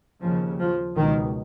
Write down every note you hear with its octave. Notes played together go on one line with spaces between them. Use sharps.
D#2 C#3 F3
F3
C#2 B2 D#3